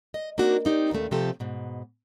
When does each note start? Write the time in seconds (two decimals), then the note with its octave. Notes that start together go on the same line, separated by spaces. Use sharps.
0.14 D#5
0.38 A#3 C4 D4 D#4 F#4
0.65 C4 D#4 F4 G4 D5
0.91 D#2 A#2 C#3 A3 C#4
1.11 C3 F3 A3 C4 G4 A4
1.40 G#2 B2